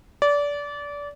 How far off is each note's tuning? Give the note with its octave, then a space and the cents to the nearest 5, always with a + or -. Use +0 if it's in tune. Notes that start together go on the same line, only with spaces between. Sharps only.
D5 -25